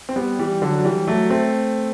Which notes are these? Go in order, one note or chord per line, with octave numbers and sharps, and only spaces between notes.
C4
G3 B3
E3 G3
D3 F#3
F#3
E3 G3
F#3 A3
A3 C4